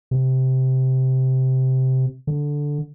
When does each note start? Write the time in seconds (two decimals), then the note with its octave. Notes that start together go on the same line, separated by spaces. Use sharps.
0.11 C3
2.27 D3